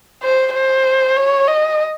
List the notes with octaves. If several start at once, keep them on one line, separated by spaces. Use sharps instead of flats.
C5
C5
C#5
D#5